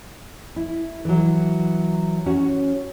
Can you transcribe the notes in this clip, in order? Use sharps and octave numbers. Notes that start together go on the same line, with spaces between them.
E4
E3 F#3
C#4 F#4 C#5